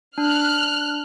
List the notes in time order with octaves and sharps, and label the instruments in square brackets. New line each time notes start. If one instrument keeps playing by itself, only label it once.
[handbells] D4 [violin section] F6 F#6